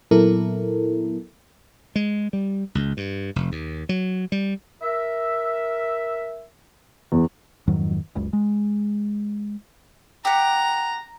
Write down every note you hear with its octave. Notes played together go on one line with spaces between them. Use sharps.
A#2 F#3 B3 E4 A4 A#4
G#3
G3
C#2
G2
F1
D#2
F#3
G3
A#4 E5
E2
F2 G#2 D#3 F#3
F#1 C#2
G#3
G4 F#5 A#5